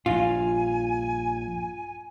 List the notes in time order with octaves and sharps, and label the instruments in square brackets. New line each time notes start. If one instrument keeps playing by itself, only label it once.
[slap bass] A#1 G2 [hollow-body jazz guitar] F4 [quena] G#5